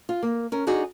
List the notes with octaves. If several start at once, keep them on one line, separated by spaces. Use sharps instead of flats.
F4
A#3
C#4 A#4
D4 D#4 F#4 G#4